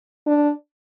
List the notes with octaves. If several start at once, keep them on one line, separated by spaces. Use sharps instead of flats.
D4